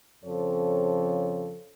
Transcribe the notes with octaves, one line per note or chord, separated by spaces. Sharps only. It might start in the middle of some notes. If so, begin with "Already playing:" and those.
F2 C#3 F3 A4 C#5